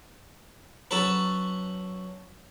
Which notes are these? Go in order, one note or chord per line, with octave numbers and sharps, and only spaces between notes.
F#3 C#4 A4 B4